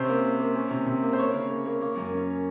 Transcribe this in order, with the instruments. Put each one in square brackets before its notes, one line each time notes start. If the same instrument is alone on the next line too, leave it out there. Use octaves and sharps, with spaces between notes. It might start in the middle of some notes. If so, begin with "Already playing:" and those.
Already playing: [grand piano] C3 C#4 C5
A#3
A#3
A#3
C#4
C3
C3
A#3
C5
A#3 C#5
C#3
A#3
A#3
A#3
F#2
C#4